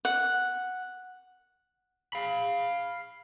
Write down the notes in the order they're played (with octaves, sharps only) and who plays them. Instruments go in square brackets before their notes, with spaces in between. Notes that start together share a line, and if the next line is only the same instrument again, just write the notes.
[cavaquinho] F#5
[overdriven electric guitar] F5 B5